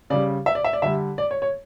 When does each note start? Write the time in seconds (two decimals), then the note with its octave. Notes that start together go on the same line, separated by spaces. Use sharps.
0.10 C#3 G3 D5
0.46 E5
0.55 D5
0.64 E5
0.73 D5
0.82 D3 G3 E5
1.18 D5
1.31 C#5
1.42 C#5